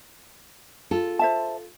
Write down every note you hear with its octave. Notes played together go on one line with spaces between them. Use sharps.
F4 A4
C5 E5 A5